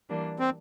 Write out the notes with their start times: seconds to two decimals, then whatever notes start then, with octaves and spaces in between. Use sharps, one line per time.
0.09 E3 G3 A#3 D4
0.39 C4